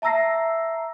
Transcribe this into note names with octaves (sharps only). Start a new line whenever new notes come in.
E5 A5 A#5 E6 A#6 C7